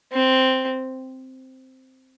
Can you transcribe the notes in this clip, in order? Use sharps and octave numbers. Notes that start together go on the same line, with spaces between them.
C4